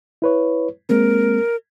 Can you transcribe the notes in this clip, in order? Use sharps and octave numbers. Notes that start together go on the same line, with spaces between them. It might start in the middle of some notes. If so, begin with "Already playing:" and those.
E4 B4 C#5
G#3 A#3 C4 A#4